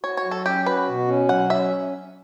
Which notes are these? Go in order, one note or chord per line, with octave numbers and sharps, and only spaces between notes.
F#4 C#5
C#5
F#3
A4
C#4 G4
F#4 B4
B2
C#4
F#3 F#5
C#4 E5